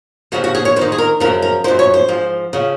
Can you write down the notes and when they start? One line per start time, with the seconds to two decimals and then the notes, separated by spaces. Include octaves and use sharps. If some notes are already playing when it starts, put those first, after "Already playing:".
0.32 D#2 C#3 F3 F#4
0.44 F#4
0.55 G#4
0.65 C#5
0.76 F2 C5
0.81 D#3
0.92 G#4
0.98 A#4
1.20 F#2 C#3 F3 A#4
1.42 A#4
1.64 F#2 F3 C5
1.79 C#5
1.94 C5
2.08 G#2 F3
2.53 C#3 F3